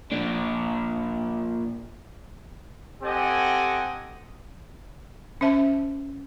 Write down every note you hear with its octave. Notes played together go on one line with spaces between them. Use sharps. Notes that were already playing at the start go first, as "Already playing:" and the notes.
A#2 D4
C4 G4 A4 D#5 F#5 G#5
C#4 C5 E5 A5